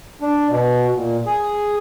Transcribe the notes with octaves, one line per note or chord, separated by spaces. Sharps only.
D4
B2
A#2
G#4